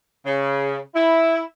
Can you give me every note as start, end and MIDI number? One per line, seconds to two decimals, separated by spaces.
0.25 0.77 49
0.95 1.41 64